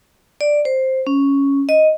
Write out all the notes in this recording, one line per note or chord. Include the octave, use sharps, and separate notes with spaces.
D5
C5
C#4
D#5